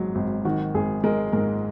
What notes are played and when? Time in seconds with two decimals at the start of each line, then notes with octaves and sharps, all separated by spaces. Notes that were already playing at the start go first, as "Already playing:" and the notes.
Already playing: G#1 G#2 F#3
0.15 G#1
0.45 D#3 F#4
0.74 G#1 G#4
1.04 G#3 A#4
1.32 G#2 A#4